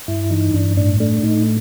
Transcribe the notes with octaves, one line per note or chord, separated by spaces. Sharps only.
G2 E4
E3 D#4
G2 D4
A2 D4
A3 D4
A2 D#4